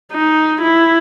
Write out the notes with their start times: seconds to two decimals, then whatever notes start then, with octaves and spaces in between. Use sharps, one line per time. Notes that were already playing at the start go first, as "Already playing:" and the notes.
0.13 D#4
0.61 E4